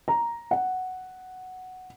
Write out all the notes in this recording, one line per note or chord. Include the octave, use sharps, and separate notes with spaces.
A#5
F#5